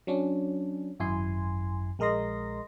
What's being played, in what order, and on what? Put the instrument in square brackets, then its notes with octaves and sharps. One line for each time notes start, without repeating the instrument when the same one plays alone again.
[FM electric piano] F#3 C#4 D4
G#1 F#2 E4 G#5 C6
A#1 G#3 A#4 D#5 C6 A#6